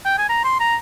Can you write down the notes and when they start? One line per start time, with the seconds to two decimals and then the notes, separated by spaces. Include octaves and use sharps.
0.05 G5
0.18 G#5
0.29 A#5
0.44 C6
0.60 A#5